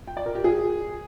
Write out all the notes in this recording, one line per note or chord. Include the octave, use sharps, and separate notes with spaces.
G5
D5
A#4
G4
G#4